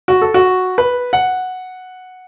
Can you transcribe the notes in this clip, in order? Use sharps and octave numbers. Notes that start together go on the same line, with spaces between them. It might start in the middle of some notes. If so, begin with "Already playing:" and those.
F#4
A4
F#4
B4
F#5